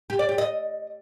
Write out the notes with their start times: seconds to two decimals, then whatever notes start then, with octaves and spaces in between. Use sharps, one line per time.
0.10 G4
0.19 D5
0.29 G4
0.38 D#5